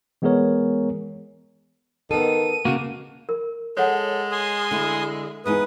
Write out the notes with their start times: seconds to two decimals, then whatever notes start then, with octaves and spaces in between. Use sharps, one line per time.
0.22 E3 G#3 B3 G#4 A#4 C#5
2.11 D#3 B3 A4 D#7
2.65 C#3 A#3 F#4
3.29 A#4
3.77 G#3 A4 C#5 F#5
4.31 G#5 C6 D#6
4.71 D3 E4
5.46 E2 G#3 D#4 B4 D#6